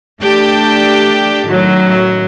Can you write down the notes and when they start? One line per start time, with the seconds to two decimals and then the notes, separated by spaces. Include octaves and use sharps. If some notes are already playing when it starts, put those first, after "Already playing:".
0.20 A3 D4 G4 G5 A5
1.47 F#2 A2 D#3 F#3